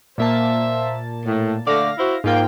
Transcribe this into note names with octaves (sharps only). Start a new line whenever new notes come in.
A#2 A#3 C5 E5 A5
A2
D3 A3 D5 F5 A#6
E4 F#4 C5
G#2 A#3 F4 G5